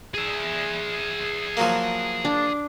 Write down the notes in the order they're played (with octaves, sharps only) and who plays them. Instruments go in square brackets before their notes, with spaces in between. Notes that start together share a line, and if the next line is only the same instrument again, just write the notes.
[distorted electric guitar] G#4 E5
[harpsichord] F3 F#3 A#3
[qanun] D4